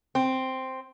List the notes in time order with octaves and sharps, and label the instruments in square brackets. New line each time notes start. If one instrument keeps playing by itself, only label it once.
[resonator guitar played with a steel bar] C4